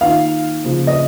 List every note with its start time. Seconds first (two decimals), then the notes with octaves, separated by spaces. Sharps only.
0.01 D#3 A#3 F4 F5
0.64 C#3 F3 A#3
0.87 D#5